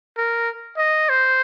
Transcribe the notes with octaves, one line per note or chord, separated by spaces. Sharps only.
A#4
D#5
C5